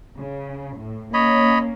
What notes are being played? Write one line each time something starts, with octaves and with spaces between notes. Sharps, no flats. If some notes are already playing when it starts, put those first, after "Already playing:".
C#3
A2
A#3 C#4 C#5 D#5 B5